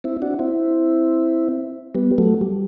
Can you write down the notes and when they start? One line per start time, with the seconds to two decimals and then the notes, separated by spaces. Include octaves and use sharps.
0.04 C4 E4
0.22 D4 F#4
0.39 C4 E4
1.95 G3 B3
2.18 F#3 A3
2.41 G3